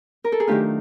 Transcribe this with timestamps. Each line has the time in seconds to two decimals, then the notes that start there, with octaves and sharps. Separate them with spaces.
0.24 A#4
0.32 A4
0.40 G#4
0.47 D#3 F#3 A3 D4 F4 G4